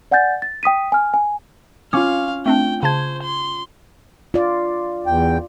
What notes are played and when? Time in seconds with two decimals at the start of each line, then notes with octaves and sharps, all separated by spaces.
0.11 D5 F#5 G#5 G6 A6
0.42 A6
0.63 G5 D#6 B6 D#7
0.92 G#5 F6
1.14 G#5
1.93 C#4 F4 F5 D6
2.46 A3 C4 D4 G5
2.83 C#3 C5 A5 G#6
3.23 C6
4.34 F4 D5
5.06 E2 G5